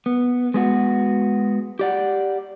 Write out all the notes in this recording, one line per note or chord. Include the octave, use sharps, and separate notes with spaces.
B3
G#3 B3 F#4
G4 D5 F#5